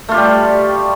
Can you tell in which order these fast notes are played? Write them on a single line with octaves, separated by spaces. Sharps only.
A3 F4 G4 G3